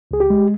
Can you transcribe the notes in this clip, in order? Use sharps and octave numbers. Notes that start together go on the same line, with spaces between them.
C#2 G#4
G4
G#3